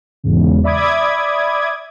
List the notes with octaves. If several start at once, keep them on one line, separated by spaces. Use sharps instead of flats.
E2 G#2 C#3
D5 E5 B5 D6 D#6 G#6